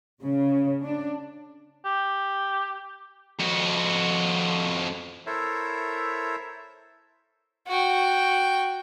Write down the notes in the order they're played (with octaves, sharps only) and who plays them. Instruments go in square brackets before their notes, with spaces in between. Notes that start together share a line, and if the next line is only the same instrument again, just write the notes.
[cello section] C#3
D4
[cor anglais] G4
[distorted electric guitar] F2 F#4
[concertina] E4 A4 A#4 C5 C#5 E5
[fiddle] F#4 G5